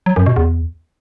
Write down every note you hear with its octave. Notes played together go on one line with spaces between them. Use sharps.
F#3
F#2
B2
E2